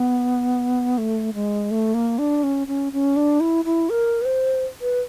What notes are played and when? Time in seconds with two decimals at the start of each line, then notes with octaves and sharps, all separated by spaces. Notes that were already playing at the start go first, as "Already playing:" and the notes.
Already playing: B3
0.98 A3
1.34 G#3
1.71 A3
1.94 A#3
2.19 D4
2.43 C#4
2.68 C#4
2.93 C#4
3.16 D4
3.40 E4
3.65 E4
3.90 A#4
4.22 B4
4.25 C5
4.81 B4